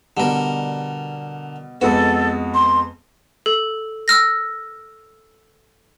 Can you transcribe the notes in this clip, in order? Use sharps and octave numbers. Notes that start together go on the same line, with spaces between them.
B2 D3 G3 A#4
F2 G#3 B3 F#4 A4
C6
A4
E6 F6 A#6